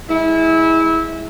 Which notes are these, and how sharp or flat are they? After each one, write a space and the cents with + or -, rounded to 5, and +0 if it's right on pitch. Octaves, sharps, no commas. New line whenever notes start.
G#3 +0 E4 -20